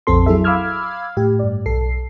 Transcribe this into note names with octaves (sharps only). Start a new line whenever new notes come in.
A#1 F2 C4 A4 C6
F#3 E4 G#4 A4 E5
F5 B5 D6 E6 F6 G#6
A2 G4
G2 D5
B1 A4 C7